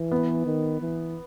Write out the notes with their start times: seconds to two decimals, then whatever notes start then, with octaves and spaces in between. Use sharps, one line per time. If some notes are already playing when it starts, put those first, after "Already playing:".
Already playing: E3
0.11 B3
0.46 D#3
0.81 E3